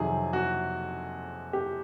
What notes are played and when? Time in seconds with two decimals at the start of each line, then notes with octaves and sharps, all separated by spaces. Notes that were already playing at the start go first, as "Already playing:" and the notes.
Already playing: F2 C3 D#3 F#3 G#4
0.33 F#4
1.53 G4